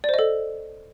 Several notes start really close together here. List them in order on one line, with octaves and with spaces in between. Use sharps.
D5 C5 D#5 A4